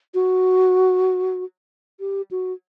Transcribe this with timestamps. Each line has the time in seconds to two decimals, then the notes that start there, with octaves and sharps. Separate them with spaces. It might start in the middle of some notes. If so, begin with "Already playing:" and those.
0.14 F#4
2.00 G4
2.31 F#4